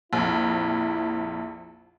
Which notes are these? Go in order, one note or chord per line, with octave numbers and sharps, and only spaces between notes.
A#1 F2 E4